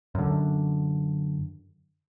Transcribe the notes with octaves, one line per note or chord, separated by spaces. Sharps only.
F#2 D3